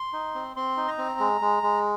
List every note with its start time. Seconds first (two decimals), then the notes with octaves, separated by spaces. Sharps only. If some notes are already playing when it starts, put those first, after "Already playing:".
Already playing: C6
0.13 D#4
0.35 C4
0.56 C4 C6
0.77 D#4
0.88 A#5
0.98 C4
1.19 G#3
1.41 G#3
1.63 G#3